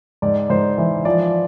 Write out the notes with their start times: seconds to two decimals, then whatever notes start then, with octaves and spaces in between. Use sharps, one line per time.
0.22 G#2 D5
0.50 G#2 C5
0.78 E3
1.05 F3 D5